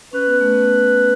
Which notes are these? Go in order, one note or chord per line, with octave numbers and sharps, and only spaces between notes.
C#4 B4
B3
A3
B3